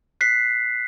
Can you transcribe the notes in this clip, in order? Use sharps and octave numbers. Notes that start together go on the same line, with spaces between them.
F#6 B6 C7